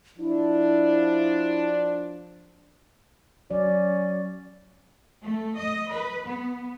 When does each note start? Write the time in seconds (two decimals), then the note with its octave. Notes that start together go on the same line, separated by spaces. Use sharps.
0.18 F3 D4 E4
3.51 F#3 C#4 D5
5.23 A3
5.58 D#5
5.90 B4
6.26 B3